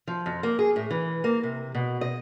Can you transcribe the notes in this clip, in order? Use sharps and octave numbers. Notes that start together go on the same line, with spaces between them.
F3
F2
A#3
G#4
A2
E3
A#3
C3
B2
D#5